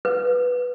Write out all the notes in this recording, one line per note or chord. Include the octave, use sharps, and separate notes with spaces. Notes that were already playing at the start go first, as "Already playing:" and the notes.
B4